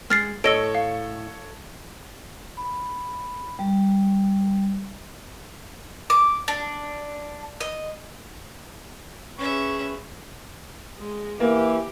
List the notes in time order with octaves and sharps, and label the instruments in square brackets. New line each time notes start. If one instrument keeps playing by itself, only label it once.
[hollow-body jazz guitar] G#3 [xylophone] F6 A6 C7
[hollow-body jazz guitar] A2 D#5 [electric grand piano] A4 C#5 [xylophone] E6 A#6 D7
[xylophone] F5
[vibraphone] B5
G3
[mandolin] D6
D4
D#5
[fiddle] C#4 E5 [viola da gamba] G#4 B4 [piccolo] C#6
[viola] G#3
[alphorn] E3 [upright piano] A#3 [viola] G4